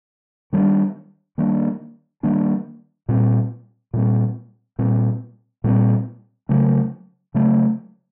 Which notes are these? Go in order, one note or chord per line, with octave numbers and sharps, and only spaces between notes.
D#3 G3 A#3 D4
D#3 G3 A#3 D4
D#3 G3 A#3 D4
A#2 G3 C4
A#2 G3 C4
A#2 G3 C4
A#2 G3 C4
C#3 F#3 A3
C#3 F#3 A3